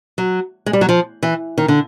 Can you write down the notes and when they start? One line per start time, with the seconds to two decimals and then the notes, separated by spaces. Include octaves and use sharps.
0.18 F#3
0.66 G#3
0.73 G3
0.81 F#3
0.89 F3
1.23 E3
1.58 D#3
1.68 D3